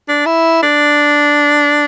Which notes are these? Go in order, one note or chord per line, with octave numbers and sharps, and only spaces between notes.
D4
E4
D4